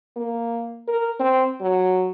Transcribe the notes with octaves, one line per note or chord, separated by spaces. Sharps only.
A#3
A#4
C4
F#3